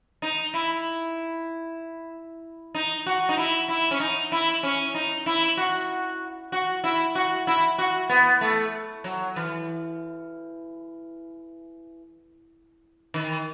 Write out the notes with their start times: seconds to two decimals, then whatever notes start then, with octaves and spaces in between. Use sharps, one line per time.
0.22 D#4
0.54 E4
2.75 D#4
3.06 F#4
3.29 D#4
3.37 E4
3.69 E4
3.91 C#4
4.00 D#4
4.32 E4
4.63 C#4
4.95 D#4
5.26 E4
5.57 F#4
6.52 F#4
6.84 E4
7.15 F#4
7.47 E4
7.78 F#4
8.09 B3
8.41 A3
9.04 F#3
9.36 E3
13.14 D#3